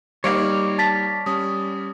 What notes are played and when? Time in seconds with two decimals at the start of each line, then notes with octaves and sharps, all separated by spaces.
0.24 G3 A#3 D#4 C#5 D5 F5
0.78 A5 A6 B6
1.26 G3 C#4 D#6